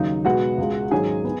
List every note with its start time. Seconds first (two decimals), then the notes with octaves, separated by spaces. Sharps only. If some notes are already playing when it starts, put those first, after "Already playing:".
Already playing: D#2 C#3 F#3 D#4
0.25 B2 G#3 B3 F#4 F#5
0.58 C#2 C#3 G#3
0.91 G#2 D#3 F#3 C#4 G#4 G#5
1.24 B3